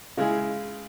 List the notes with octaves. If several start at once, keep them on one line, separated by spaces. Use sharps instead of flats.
C#3 G#3 E4 G#4